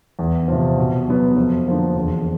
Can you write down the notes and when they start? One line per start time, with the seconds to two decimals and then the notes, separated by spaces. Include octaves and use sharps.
0.19 E2
0.48 C3 F3
0.78 B2
1.07 F#3 B3
1.37 F2
1.66 D3 F3 A#3
1.95 E1